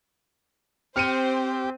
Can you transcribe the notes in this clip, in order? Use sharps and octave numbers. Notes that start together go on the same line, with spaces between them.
C4 G4 C5 F6 C#7 D#7